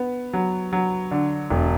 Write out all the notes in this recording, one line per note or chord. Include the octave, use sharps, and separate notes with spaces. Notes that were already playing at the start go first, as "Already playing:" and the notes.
Already playing: B3
F#3
F#3
D3
E1